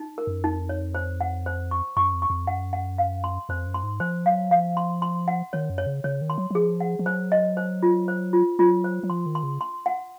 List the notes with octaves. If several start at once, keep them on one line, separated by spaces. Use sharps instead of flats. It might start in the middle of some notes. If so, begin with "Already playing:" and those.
Already playing: D#4
A#4
F#2
F2 D#4
C#5
C5
F#5
C5
C#6
F#2 C#6
F2
C#6
F2
F#2 F#5
F#5
F5
C6
F2 C5
F#2
C6
G#2
F3 C5
F#3 F5
F3 F5
C6
C6
F#5
D#3 C#5
F#2
C#5
C#3
C#3 C#5
D#3
C6
F#3
F#3
F3 G#4
F#5
F3
F#3 C5
D#5
C5
F4
C5
F4
F#3 F4
C5
F#3
F3 C6
D#3
C6
C#3
C6
F#5